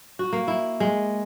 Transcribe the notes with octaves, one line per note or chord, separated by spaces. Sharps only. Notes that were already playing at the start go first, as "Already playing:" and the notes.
F#4
A#3
E4
G#3